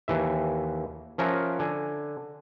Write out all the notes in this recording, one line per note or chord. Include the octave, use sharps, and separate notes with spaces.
D#2 E3 E5
F3 C#4 A#4 E5 F#5
D3 G#5